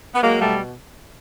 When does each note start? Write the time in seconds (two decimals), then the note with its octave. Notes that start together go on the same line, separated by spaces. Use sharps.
0.15 B3
0.23 F#3 G#3 A#3
0.41 B2 G3 A3